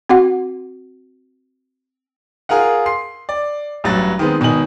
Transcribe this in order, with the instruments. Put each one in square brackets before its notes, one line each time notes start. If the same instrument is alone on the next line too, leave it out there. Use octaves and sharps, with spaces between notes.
[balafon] C4 F#4 F#5
[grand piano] F4 G#4 A#4 F5 F#5
C6 C7
D5
A1 G2 F#3 F#4 A6
D#3 G#3 B3 C4
G#1 B2 D#3 D#4 G#5 F#7